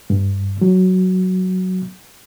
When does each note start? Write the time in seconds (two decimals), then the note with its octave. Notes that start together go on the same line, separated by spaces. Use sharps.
0.10 G2
0.61 F#3